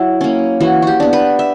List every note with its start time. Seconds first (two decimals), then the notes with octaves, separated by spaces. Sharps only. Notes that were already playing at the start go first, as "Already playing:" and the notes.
Already playing: F#3 E4 F#4
0.21 A#3 C#4
0.60 E3 F#4
0.82 F#4 G4
1.00 B3 D4
1.13 B4
1.39 E5